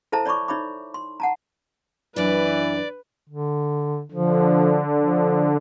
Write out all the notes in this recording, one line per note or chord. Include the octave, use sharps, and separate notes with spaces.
E4 A4 C5 E5 A5 A#5
C#5 D5 B5 C#6 D6
D#4 C#5 E5 B5 D6
C6
F#5 A5 A#5
F#2 E3 D4 B4 D5
D3
D3 F3
F3